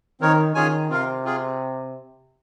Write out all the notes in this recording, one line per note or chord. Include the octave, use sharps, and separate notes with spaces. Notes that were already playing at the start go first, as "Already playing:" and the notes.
D#3 C4 D#4 A#4 C#5
D#3 C#4 F4 G#4 C#5 G#5
C3 C4 F4 A#4 F5
C4 F4 G#4